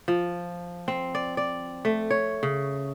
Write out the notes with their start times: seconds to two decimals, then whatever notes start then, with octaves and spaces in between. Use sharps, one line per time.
0.08 F3
0.88 C4
1.15 D5
1.37 D5
1.85 A3
2.10 C#5
2.43 C#3